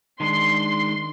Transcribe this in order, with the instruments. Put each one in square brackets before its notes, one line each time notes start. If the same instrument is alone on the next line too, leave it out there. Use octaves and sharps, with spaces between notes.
[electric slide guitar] D#3 G#3 D4 [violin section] C6